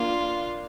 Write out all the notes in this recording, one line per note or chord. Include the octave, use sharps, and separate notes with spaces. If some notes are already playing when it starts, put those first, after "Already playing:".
Already playing: A#3 D4 F4